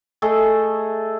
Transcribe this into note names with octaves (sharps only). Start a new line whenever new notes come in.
A3 G#4 A4 D#5